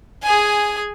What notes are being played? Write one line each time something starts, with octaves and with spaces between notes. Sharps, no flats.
G#4 G#5